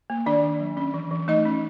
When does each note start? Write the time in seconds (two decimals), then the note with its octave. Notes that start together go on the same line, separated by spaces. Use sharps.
0.10 A#3
0.26 D#3 D4 D5
0.43 D#3
0.60 F#3
0.77 C#4
0.94 E3
1.11 E3
1.28 A3 D#4 D#5
1.45 C#4